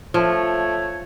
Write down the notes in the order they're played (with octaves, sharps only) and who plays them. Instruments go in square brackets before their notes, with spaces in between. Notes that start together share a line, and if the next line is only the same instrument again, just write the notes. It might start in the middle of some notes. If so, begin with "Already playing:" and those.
[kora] F3 [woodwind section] A3 C#5